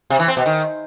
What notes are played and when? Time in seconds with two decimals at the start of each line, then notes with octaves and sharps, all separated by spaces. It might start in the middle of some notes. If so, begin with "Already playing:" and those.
0.10 C3
0.19 E3
0.28 C4
0.37 B2
0.46 D#3